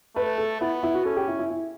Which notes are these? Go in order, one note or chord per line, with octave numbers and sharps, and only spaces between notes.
A3 B4
A4
B3 E4
E4
F#4
C#4 A4
G4
E4
E4
E4